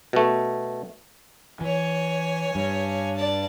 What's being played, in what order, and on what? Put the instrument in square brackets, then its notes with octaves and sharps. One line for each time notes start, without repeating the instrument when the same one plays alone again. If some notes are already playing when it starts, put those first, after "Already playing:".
[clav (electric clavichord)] B2 A3
[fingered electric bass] E3 [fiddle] C#5 G#5
[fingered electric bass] G2
[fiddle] D5 A5